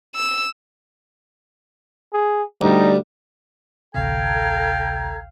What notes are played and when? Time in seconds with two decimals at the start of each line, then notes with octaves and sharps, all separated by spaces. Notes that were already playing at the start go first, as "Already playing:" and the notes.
0.15 E6
2.13 G#4
2.61 D2 G3 D#4
3.95 A1 D2 C3 A4 F5 G5 A#5 G#6